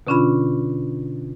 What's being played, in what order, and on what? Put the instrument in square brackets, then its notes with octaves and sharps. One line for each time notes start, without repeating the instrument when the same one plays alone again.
[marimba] B2 D3 C#4 D4 F4 B5